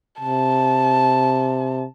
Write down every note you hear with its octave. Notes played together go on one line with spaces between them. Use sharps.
C3 A5